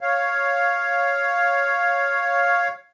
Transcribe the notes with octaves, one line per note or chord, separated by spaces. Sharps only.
C#5 F5